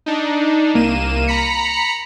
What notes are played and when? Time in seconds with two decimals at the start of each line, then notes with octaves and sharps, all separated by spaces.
0.06 D4 D#4
0.74 C2 A#3 D#7 E7
1.27 A#5 B5 B6 C#7